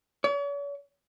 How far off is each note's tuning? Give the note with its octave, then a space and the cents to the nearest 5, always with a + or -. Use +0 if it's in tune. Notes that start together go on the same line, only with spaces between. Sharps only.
C#5 +45